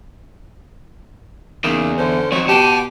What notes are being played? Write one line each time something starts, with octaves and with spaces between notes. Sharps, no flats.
E2 C#3 A#3 D#4
D3 C#4 C5
F3 F#3 C4 D#4 C#5
B2 G4 F#5 A5